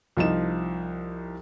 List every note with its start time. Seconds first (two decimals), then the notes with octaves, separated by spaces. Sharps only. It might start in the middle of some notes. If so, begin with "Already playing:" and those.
0.17 C2 F3 D#4 E7